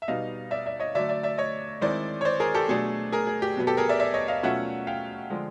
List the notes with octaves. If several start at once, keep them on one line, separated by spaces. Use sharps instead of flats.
E5
B2 G3 B3 D#4 D#5 F5
D5 E5
D5 E5
C#5 D#5
D3 F#3 A3 D5 E5
D5 E5
D5 E5
C#5 D#5
D#3 G#3 C4 E4 C5 D5
C#5
C5 D5
G#4 A#4
G4 A4
B2 F#3 A3 D4 G#4
G#4 A#4
G#4
G4
B2 F#3 B3
G4 A4
G#4 A#4
D5 E5
D5 E5
C#5 D#5
D#5 F5
B2 F#3 A3 C#4 F4 E5 F#5
F5 G5
D3 F3 G#3